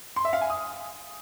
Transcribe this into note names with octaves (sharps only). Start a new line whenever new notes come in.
C6
E5
F5
G#5
D#6